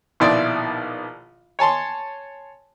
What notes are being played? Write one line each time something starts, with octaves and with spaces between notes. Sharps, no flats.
A#1 B2 D#3 E4 D5 C6
C#5 G#5 A5 C6